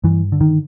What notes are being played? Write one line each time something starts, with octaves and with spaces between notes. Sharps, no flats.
G2 E3
D3
D#3